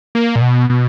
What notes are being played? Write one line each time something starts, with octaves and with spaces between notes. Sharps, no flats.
A#3
A#2
B2
B2